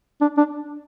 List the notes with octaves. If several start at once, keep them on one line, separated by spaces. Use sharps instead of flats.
D4
D4